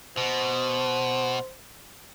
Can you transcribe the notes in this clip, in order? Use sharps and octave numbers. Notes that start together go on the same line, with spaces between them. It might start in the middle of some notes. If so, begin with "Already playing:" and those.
B2 C5